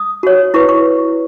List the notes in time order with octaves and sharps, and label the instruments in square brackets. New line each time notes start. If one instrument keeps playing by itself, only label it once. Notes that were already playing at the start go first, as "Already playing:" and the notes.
Already playing: [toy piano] D#6
F#4 C#5
E4 B4 C#6
C#6